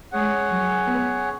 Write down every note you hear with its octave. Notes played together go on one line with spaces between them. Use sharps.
G#3 C#4 G#4 C#5 F#5
F#3
B3